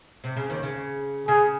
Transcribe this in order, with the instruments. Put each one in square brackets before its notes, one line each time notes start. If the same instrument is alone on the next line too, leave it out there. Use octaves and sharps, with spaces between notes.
[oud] C3
C#3
D#2 D#3
C#3
[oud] C#3 [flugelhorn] G#4